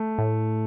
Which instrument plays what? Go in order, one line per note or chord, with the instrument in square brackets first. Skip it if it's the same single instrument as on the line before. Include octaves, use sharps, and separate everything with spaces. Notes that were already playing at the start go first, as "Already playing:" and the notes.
Already playing: [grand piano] A3
[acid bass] A2